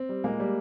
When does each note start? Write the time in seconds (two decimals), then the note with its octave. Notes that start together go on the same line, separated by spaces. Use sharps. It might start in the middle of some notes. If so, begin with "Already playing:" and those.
Already playing: C4
0.09 G3
0.24 A#2 G#3 A#3
0.40 G3